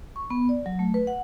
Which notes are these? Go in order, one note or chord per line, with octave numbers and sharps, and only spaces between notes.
C#6
B3
D5
F#3
A3
B4
F#5